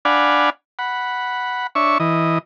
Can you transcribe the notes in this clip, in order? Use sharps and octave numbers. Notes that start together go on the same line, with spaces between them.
D4 D5 F5 F#5 G#5 B5
F#5 B5
D4 C#5 E5 C#6
E3 D#5